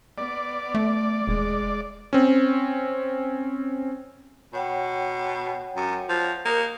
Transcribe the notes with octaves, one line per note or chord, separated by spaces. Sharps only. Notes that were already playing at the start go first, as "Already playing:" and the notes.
B3 D5
A3
E1 G#3
C4 C#4
B2 C#5 F#5 G5
F#2
F3
A#3 A#4 D#6